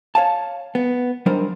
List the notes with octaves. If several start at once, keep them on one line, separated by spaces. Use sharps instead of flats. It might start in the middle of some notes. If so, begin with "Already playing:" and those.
C#5 F5 A5
B3
F#3 G3 D4 D#4 A#4 C5